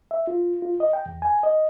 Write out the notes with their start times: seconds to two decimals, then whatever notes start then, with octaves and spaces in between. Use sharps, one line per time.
0.11 E5
0.27 F4
0.62 F4
0.80 D#5
0.93 G5
1.06 E2
1.22 G#5
1.43 D#5